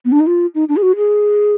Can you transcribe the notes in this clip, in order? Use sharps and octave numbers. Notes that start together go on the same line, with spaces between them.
B3
D4
D#4
F4
D#4
D4
G#4
F#4
G#4